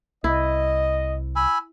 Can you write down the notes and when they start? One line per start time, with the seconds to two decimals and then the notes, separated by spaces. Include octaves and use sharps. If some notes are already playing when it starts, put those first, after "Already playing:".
0.24 C2 E4 D#5
1.36 G#5 B5 E6